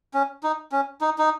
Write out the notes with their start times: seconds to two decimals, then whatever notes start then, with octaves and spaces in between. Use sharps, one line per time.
0.14 C#4
0.43 D#4
0.72 C#4
1.01 D#4
1.18 D#4